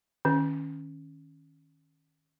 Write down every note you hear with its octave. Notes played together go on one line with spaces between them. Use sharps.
D#3 C#4